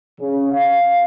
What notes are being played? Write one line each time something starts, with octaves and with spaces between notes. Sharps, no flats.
C#3
F5